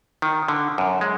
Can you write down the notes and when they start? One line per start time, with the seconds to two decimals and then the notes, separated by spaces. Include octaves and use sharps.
0.22 D#3
0.48 D3
0.78 F#2
1.01 G#3